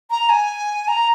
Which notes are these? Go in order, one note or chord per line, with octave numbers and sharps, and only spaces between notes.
A#5
G#5
A#5